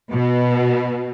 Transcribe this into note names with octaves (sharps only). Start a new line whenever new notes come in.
B2